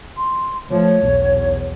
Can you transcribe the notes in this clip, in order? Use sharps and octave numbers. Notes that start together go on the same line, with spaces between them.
C6
F3 A3 C#5
B1 E2